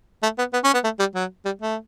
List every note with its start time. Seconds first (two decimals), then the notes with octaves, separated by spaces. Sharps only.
0.23 A3
0.38 B3
0.53 B3
0.64 C#4
0.74 B3
0.84 A3
0.99 G3
1.15 F#3
1.45 G3
1.62 A3